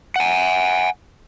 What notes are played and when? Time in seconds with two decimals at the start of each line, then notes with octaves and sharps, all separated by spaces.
0.16 F#5 G#5